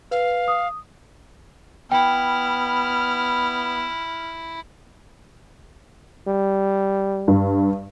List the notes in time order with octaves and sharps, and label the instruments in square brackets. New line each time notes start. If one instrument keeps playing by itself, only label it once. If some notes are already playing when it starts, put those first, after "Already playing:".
[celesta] B4 [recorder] F5
[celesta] D#6
[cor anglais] B3 [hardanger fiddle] E4 [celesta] G5 [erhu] F6
[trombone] G3
[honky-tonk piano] G2